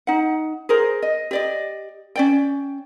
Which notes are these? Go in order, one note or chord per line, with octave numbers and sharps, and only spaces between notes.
D#4 F#5
G#4 A#4 C5
D#5
G4 D5 D#5
C#4 D5 G5